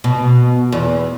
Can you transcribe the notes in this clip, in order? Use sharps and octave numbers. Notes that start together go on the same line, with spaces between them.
B2
E2